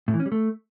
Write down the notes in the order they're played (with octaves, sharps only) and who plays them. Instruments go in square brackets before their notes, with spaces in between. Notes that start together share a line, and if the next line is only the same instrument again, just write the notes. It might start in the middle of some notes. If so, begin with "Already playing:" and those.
[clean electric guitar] A2
E3
C#4
G3
A3